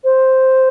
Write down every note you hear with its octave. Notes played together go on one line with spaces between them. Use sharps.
C5